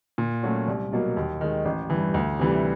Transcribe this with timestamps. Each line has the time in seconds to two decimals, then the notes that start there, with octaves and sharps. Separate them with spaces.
0.18 A#2
0.43 F#3 A3 C#4 F#4
0.68 C2
0.92 B2 F#3 A#3
1.17 D#2
1.41 D#3 G#3
1.65 A1
1.90 G2 E3
2.14 D2
2.39 C3 E3 G3